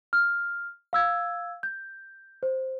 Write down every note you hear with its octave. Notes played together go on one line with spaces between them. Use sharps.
F6
F5 E6 G#6
G6
C5